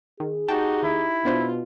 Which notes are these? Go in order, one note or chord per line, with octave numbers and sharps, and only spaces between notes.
D#3 G#4
D#4 F#4 G4 G5 A5
D#2 E4
B2 B3 D4 F4 C5